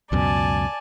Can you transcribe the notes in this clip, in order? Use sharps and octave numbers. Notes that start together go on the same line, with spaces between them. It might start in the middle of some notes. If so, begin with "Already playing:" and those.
C#2 F#2 B2 D5 G#5 A5